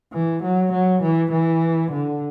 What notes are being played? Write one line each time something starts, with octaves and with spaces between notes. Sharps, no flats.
E3
F#3
F#3
E3
E3
D3